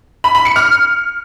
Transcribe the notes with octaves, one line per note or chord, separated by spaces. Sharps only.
B5
B5
C#7
F6